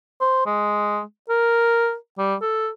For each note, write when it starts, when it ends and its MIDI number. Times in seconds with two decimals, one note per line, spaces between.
0.21 0.44 72
0.46 1.01 56
1.29 1.95 70
2.18 2.35 55
2.41 2.68 69